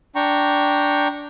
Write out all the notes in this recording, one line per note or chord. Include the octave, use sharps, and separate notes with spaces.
D4 G5 A#5 C#6